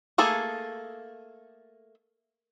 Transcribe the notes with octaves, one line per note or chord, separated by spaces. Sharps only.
A3 A#3 G#4 A4